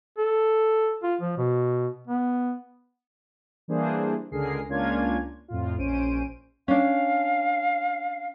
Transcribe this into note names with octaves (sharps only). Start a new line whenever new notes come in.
A4
F4
F3
B2
B3
E3 G3 A#3 D4 G#4 C5
C#2 D3 G#4 A#4 C7
C#2 A#3 C#4 D4 F4 G#6
F2 A2 F4
A#1 C#4 C5 D7 D#7
C#4 D4 F5